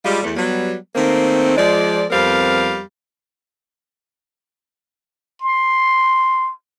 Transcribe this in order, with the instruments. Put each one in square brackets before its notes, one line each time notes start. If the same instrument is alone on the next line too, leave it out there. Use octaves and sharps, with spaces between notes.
[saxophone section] G3 G#3 F4
E2 A3
F#3 G3 B3
D#3 A3 A#3 C4
F3 G#3 D5
F2 G3 B3 C4 A#4 F5
[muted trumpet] C6